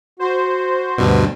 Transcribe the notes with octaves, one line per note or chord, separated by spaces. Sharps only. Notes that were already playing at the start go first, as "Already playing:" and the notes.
F#4 C5
D2 G2 B2